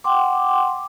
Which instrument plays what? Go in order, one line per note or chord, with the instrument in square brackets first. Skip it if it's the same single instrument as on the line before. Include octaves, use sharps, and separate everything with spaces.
[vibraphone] F#5 G5 C6 D6